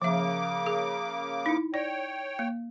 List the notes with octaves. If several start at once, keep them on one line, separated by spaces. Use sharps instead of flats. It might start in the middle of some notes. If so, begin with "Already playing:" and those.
C#3 F3 A#3 E5 D6
G#4
D#4 E4
C#5 D5 G5
A#3